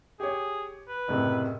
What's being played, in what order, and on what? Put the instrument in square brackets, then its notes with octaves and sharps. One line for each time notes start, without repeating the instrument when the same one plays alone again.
[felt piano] G4 C#5 [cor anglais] G#4
[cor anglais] B4
[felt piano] F#1 A2 C3